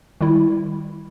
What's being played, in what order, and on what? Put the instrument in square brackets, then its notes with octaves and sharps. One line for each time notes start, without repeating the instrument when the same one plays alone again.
[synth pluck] D#3 G3 E4